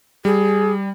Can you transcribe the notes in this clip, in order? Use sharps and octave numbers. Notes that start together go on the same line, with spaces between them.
G3 G#4